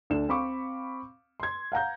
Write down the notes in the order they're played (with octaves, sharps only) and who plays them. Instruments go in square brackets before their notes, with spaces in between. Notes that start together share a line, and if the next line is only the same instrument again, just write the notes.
[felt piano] D2 D4 E7
C4 F5 B5 C#6 D6
C6 G#6
F5 F#5 A#5 G6